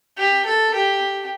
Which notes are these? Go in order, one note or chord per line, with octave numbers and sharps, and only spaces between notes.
G4
A4
G4